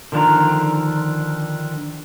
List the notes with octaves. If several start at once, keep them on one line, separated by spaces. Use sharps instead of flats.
D3 D#3 F3 D4 F4 A#5